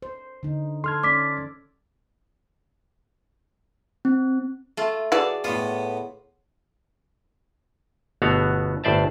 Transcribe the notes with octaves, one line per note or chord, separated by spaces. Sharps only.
C5
D3 D#4
A4 C6 F6 G#6
C#4 D5 D6 B6
C4
A3 F4
E3 F#4 G#4 D5 A5
A2 B3 F4
G1 B2 A3 B3 F#4 F5
G1 A2 C5 D5 E5 A5